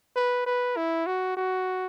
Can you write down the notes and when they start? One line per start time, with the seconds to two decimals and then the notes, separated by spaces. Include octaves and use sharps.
0.16 B4
0.46 B4
0.77 E4
1.07 F#4
1.37 F#4